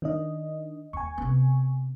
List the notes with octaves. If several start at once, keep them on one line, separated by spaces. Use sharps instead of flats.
D#3 D4 D#5
D#2 G#5 C#6
C3 B3